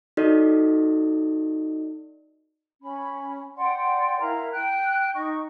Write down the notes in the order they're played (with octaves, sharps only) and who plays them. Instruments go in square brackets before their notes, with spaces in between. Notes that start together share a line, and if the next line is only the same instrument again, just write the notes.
[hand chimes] D#4 F#4 A4 D5 D#5
[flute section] C#4 B5
D5 F#5 G5 C6
E4 A#4 F5 A#5
G5 F#6
D#4 D#5 C#6